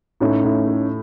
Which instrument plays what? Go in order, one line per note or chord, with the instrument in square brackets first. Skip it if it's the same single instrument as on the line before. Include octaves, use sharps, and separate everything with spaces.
[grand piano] A2 [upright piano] C#4 D#4
[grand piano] A2
A3